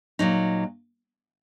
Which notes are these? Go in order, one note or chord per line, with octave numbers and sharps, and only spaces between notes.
A#2 F#3 D#4